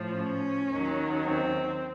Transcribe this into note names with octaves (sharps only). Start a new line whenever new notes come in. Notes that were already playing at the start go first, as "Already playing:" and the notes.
Already playing: A2 F3
C#4
D#2 D#3 F#3
C4